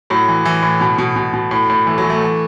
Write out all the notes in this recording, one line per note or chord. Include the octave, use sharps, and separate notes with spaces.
A2 F#3
E3
E3
A2
B2
B2
B2
B2
A2
A2
E3 A3
F#3
E3
A3
E3